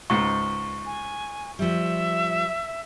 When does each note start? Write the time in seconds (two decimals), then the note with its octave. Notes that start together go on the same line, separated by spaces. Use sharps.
0.10 C#2 G#2 C#6
0.86 G#5
1.59 F3 G3 E5